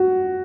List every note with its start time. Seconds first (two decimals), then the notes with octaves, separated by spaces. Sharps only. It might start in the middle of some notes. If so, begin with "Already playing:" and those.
Already playing: F#4